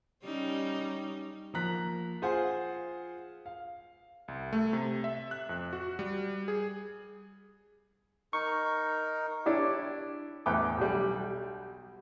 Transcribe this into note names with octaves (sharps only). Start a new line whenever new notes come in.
G3 C#4 D#4
F3 A#3 A#5 F#6 B6
F4 G#4 C5 F#5 G#5
F5
C2
A3
C3
E5
F#6
F2
F#4
G3
G#4
D#4 A#4 C#6
D4 E4 G4 C#5
A1 E2 B4 G5 D6
B1 G3